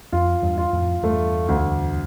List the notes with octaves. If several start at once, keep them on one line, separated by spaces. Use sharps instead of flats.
F2 F4
E2 G2
F4
F2 A2
E2 G2 A3
D2